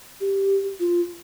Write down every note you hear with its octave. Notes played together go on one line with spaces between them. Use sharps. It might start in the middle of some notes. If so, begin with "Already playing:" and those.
G4
F4